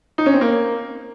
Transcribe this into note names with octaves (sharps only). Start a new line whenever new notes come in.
D#4
C#4
C4
A#3